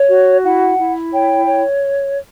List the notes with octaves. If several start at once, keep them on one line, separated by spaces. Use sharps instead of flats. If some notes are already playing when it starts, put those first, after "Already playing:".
Already playing: C#5
F#4
E4 F#5
E4
C#5 G5
C#5